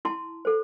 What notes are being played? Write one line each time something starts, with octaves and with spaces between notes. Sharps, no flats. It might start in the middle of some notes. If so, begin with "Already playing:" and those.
E4 A5 C6
A4 C5